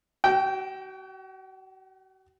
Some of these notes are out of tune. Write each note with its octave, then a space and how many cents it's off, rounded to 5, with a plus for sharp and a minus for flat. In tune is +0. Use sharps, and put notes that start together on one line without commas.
F#4 +40 G5 -15